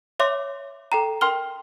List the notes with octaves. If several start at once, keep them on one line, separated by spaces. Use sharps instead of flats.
C#5 E5 C6 D6
A4 G5 A#5
A#4 G5 C6 F6 G7